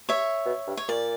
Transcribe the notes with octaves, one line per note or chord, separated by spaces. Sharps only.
C#5 E5
B2
G2
C#5
A#2 D5